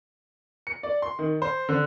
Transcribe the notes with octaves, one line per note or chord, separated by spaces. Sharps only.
C#7
D5
C6
D#3
C5
D3